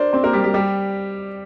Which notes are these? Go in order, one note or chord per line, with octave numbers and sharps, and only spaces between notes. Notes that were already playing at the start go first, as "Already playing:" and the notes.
Already playing: D4 A#4 C5 D5
C4 C5
A#3 A#4
G3 G4
G3 G4
G3 G4